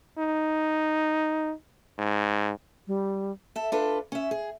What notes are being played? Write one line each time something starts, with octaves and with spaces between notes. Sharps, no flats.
D#4
G#2
G3
A4 E5
D4 F4 A4 B4
C#4 E5
G#4